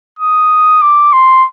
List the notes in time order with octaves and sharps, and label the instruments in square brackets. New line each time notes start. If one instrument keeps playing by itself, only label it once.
[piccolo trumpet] D#6
D6
C6